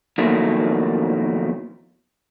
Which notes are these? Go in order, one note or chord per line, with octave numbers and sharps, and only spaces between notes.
B1 F2 D#3 F#3 A3 A#3